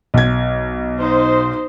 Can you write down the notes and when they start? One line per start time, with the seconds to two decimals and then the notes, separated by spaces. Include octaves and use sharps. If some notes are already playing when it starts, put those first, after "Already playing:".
0.14 B1 G#6
0.99 D#4 C5